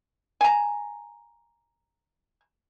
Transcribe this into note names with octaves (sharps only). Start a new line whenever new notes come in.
G#5 A#5